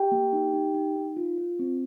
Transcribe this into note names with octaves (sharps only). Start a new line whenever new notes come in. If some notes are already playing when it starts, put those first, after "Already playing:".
Already playing: G4 G5
A#3
D#4
D#4
D#4
D#4
F4
F4
C4